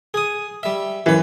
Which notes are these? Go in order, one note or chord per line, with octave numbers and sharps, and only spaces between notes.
G#4 D#6
G3 E5
F#2 E3 B4